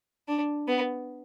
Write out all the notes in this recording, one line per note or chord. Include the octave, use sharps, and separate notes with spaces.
D4
B3